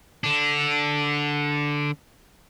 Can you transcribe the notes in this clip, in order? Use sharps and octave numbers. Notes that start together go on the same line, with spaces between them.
D3 D4